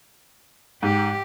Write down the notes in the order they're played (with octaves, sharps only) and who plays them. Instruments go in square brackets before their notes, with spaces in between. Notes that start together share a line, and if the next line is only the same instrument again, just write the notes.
[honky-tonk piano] G#2 [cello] G4